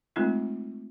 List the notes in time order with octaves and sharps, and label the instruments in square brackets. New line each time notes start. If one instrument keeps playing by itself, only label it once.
[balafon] G#3 A3 C4 D#4 F4